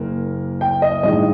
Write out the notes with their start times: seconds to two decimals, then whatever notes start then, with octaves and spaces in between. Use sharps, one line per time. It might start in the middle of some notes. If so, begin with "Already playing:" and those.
Already playing: F#1 A#3
0.61 G5
0.82 D#5
1.03 A1 G2 D#3 G#3 D#5